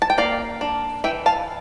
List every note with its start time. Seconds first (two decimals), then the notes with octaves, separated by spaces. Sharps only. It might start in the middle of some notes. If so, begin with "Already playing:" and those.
0.02 A5
0.10 G5
0.18 A#3 D5 F5
0.61 D4
1.04 E3 E5 G5
1.26 F5 A5